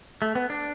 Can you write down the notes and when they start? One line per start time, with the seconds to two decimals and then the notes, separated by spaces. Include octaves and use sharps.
0.22 A3
0.35 B3
0.50 D4